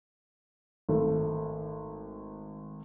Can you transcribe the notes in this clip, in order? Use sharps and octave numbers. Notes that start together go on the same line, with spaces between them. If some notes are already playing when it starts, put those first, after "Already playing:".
G#1 A3